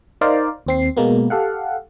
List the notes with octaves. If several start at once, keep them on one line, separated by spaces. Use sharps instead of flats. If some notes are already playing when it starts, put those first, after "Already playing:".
D#4 A#4 C5 D5 F5
D#2 C4 C7
B2 G#3 A#3 B3
G4 A4 F5 F#5